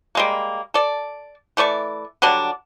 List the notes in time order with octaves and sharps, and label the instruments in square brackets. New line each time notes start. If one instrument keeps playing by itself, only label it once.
[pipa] G3 G#3 A#3
A4 D5
E3 A3 D5 C#6
D3 F#3 G3 D4